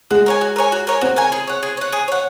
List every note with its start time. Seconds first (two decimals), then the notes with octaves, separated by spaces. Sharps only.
0.11 G#3 F#4
0.26 A#4 C#5 G#5
0.41 F#4
0.56 A#4 C#5 G#5
0.72 F#4
0.87 A#4 C#5 G#5
1.01 C4 F#4
1.16 A#4 C#5 G#5
1.32 G#4
1.47 C#5 F#5
1.63 G#4
1.77 C#5 F#5
1.92 G#4
2.08 C#5 F#5